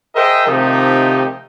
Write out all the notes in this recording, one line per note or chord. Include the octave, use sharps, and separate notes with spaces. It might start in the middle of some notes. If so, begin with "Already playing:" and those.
G#4 A#4 C5 D#5 E5 G5
C3 D#3 F3 A3 D#4 G4